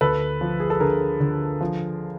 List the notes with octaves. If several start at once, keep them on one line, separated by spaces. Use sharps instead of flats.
D2 A4 B4
F3
G#4
A4
D3 G#4 A#4
D3
F3